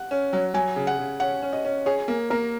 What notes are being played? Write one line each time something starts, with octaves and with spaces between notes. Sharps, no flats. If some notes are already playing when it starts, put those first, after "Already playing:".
Already playing: F#5
C#4
F#3
F#3 G#5
C#3
F#5
C#3
C#4 F#5
C#4
D#5
C#4
G#4 C#5
A#3
A#3 A#4